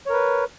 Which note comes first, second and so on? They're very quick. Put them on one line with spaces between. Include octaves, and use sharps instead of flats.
C#5 A#4 B4